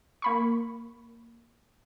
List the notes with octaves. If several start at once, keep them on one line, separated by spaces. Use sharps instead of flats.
A#3 B5 C#6